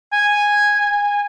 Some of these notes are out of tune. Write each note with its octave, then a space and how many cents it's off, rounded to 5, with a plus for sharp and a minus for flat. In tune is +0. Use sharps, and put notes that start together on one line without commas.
G#5 -5
G#5 -20